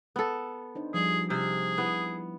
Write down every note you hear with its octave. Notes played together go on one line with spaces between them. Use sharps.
B3 A4
D4 D#4 C5
F3 G3 G#4
C3 G#4
B3 E4